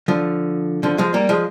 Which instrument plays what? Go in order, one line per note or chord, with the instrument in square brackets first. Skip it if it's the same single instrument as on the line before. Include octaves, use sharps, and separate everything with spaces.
[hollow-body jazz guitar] D3 F3
D3 F3
F3 G#3
G3 A#3
F3 G#3